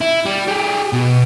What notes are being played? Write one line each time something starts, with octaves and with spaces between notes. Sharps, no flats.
E4
G3
G4 G#4
B2